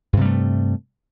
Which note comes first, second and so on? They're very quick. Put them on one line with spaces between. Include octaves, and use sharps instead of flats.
G2 C3 G3 A3